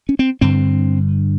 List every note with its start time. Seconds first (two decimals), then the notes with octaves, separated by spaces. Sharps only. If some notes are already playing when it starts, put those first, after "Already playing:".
0.09 C#4
0.19 C4
0.41 G2 D3 C4